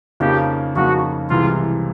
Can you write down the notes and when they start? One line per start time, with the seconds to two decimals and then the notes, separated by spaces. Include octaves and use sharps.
0.20 F2 C#3 F3 A#3 D#4 G4
0.75 F2 C#3 F3 A#3 D#4 F#4
1.30 C2 C3 E3 G#3 F4